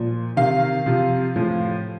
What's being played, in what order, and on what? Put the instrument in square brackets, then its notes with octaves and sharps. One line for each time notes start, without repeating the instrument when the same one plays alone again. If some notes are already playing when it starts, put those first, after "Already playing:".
Already playing: [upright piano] A#2 F3
C3 D#3 F5
C3 F3
A2 F3